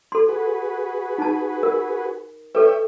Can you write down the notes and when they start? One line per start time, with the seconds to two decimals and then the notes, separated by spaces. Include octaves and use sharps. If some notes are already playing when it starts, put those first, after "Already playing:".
0.12 A4 C6
0.29 F#4 G#4 B4
1.18 D#4 A5
1.63 A#4
2.55 A4 B4 C#5 E5 G5